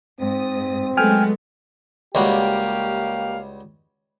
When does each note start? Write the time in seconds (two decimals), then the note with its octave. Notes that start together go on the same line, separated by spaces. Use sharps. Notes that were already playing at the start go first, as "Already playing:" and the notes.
0.20 G#2 C4 D#6
0.97 F#3 G#3 A3 B3 G5 G#5 F6
2.15 C#2 G3 A#3 F#4 G4 F5